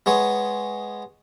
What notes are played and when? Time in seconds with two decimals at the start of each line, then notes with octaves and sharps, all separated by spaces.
0.06 G#3 B3 C#5